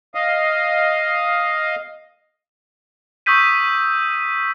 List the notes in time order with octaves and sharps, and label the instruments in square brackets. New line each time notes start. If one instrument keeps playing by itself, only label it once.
[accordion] D#5 F5
[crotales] C#6 D#6 E6 G6 B6 D#7